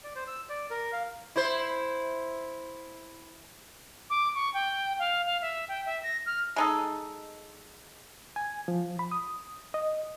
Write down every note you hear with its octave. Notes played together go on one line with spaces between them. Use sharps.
D5
C5
E6
D5
A#4
F5
E4 C5
D6
C#6
G5
F5
F5
E5
G5
E5
A#6
F6
G#3 D#4 A4
G#5
F3
B5
D#6
D#5